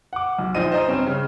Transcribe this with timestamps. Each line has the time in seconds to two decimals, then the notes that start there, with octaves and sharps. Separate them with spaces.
0.13 F#5 D6
0.39 B1
0.55 A#1 D#4 F4 C5 D#5 D#7
0.72 C5 D#5 A#5
0.88 G2 C4 C#4
1.07 C#3